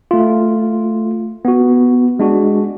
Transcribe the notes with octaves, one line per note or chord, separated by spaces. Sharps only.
A3 F4
B3 F#4
G#3 D4 F#4